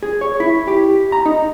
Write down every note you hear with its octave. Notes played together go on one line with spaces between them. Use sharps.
G#4
C#5
E4
G4
A#5
D#4